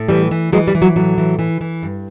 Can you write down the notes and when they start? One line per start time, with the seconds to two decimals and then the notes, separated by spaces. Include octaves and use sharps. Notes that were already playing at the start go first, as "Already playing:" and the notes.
Already playing: A2
0.09 E3 G3
0.31 E3
0.52 E3 F#3 G#3
0.68 G3
0.75 E3
0.82 F#3
0.96 A2 F#3
1.18 E3
1.39 E3
1.61 E3
1.83 G2